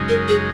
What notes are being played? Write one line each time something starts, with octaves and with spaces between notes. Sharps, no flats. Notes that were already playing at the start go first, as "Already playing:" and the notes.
Already playing: F#2 C#3 G#3 D#4
A#4
G#4